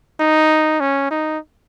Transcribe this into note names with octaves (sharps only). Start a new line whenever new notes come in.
D#4
C#4
D#4